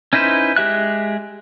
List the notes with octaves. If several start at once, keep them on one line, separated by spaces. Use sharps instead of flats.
C#4 D#4 E4 B4 C5
G#3 G4 E5 F#6